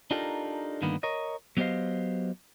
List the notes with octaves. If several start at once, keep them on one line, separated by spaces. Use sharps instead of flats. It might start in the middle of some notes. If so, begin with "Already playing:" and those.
D4 D#4 F4 G4 A4 A#4
G2 D3 D#3 A#3 B3
A#4 C#5 D#5
F#3 B3 G4 C5 D#5 F5